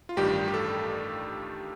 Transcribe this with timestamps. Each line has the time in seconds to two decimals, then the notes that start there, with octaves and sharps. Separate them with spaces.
0.09 F4
0.17 A1 G2 D#3 G3 G4
0.48 G4
0.54 A4